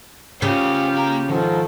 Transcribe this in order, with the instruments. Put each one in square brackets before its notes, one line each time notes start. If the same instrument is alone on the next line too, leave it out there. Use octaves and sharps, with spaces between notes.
[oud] C#3 [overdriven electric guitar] A3 C5 [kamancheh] F4 G4
[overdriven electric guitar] A#3 A#5
[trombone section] G#2 F3 A4 [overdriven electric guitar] D#3